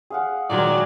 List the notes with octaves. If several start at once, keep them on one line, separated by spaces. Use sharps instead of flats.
G#4 F5 F#5
A#2 D#3 F#3 G#3 D5